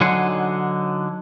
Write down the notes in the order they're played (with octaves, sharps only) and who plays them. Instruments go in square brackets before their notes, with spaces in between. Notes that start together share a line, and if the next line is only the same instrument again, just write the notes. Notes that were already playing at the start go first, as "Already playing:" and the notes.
[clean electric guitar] D3 F#3 D#4 F#5 G#5 C6